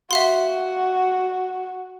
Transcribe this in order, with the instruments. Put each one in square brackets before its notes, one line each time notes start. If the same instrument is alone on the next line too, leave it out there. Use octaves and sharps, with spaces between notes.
[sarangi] F#4 [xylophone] E5 F5 C6